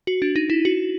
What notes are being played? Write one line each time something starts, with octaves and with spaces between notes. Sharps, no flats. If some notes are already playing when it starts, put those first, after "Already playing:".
F#4
D4
D#4
E4
F#4